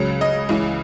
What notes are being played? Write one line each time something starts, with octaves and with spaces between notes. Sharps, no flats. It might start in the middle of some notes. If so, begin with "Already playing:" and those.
Already playing: C#2 C#3 F#3
D#5
C#2 C#3 E3